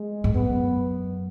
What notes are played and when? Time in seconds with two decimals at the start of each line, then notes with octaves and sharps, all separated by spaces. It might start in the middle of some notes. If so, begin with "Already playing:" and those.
Already playing: G#3
0.24 G#2
0.34 F#2 B3